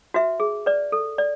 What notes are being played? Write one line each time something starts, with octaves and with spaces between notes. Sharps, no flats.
F#4 B4 E5
G#4
B4 D5
A4
D5